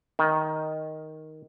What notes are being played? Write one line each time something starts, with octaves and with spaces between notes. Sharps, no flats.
D#3